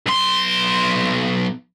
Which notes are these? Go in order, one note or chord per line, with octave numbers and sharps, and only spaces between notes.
B1 C6